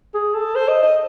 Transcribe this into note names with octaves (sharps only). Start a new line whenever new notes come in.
G#4
A4
C5
D#5
D#5